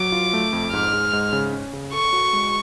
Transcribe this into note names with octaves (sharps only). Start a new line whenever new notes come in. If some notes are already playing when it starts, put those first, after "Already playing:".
Already playing: F#3 D6
F4
A3
F2
G#2 F6
G#3
G#2
C#3
C#4
C#3
A4 C#6
F#4
G#3